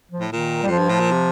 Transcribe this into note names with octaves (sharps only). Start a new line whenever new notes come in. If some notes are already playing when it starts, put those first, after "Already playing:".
F3
A2
A#2 D#3
G3
F2 F3
G2
A2
A#2
C3